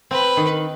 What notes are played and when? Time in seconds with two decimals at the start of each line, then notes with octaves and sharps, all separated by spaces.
0.11 C4 B4
0.37 D#3